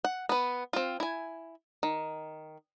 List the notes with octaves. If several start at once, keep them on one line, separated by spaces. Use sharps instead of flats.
F#5
B3 B4
C4 F4
E4 G#5
D#3